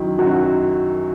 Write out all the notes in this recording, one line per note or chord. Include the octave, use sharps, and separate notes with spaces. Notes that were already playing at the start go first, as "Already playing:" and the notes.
Already playing: F#2 D#3 F#3 E4
F#2 D#3 F#3 F#4